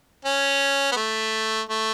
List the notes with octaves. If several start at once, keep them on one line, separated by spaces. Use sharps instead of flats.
C#4
B3
A3
A3